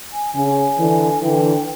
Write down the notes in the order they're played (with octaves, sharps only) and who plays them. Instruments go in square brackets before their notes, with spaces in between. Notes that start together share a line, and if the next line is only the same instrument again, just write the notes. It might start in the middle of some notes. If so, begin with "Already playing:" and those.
[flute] G#5
[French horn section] C#3 [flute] G#5
[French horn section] D3 E3
[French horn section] D3 E3 [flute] G5